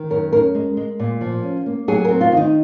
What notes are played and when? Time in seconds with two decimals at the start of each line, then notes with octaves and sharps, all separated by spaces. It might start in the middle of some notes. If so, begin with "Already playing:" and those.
Already playing: D#3
0.10 F#2 A#4
0.32 C#4 A#4
0.54 G#3
0.77 G#3
1.00 A#2
1.21 F3
1.43 C#4
1.66 A#3
1.88 F#3 G#4
2.05 A#4
2.10 C4
2.21 F4
2.32 D#3
2.37 D#4